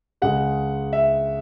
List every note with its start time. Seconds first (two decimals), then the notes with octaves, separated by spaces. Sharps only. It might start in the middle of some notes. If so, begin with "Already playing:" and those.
0.22 C#2 C#3 G#3 F#5
0.93 E5